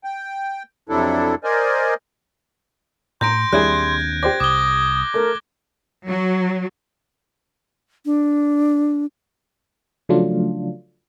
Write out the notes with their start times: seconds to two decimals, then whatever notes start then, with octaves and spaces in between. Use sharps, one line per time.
0.04 G5
0.89 F2 C3 F#3 D4 E4 A4
1.44 A#4 C5 D5 D#5 G#5
3.21 A2 A#5 C6 G6 A#6 D7
3.53 D#2 G3 C4 D4 E4 G#4 F#6 G#6
4.23 G4 C5 D5 A#6
4.40 C2 D6 D#6 G7
5.14 A3 A#4
6.05 F#3
8.05 D4
10.09 C#3 F3 F#3 A3 D4 F4